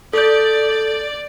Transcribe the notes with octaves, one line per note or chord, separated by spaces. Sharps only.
A4 D5 G6